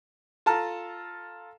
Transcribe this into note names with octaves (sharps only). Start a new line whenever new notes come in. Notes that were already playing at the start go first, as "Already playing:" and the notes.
F4 A4 A5 A#5 F6